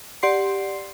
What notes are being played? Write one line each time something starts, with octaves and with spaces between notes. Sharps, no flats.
G4 D5 F#5 C6 C7